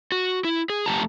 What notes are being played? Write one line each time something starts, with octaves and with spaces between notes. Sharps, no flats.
F#4
E4
G#4
F2 A3 G4 A5 A#5